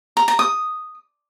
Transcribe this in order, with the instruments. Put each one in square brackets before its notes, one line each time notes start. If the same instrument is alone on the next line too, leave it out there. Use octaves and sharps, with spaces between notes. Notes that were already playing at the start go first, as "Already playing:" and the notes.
[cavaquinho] A#5
A#5
D#6